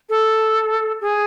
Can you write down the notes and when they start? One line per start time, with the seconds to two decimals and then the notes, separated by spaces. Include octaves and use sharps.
0.09 A4
1.00 G#4